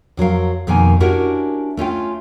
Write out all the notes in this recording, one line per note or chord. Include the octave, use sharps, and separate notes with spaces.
F2 F#3 A#4 F5
F2 B2 D#3 A#3 G#5
C#4 D4 E4 F#4 G4 A#4
A3 C#4 F4 G5